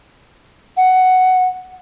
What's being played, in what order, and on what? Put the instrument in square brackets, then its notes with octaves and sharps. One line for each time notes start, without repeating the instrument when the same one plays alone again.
[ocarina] F#5